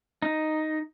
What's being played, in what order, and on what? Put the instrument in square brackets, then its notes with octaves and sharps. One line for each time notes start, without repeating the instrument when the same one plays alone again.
[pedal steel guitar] D#4